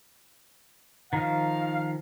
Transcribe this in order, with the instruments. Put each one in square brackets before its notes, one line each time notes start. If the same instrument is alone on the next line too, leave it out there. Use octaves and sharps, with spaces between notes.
[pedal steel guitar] D#3 F3 [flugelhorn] F5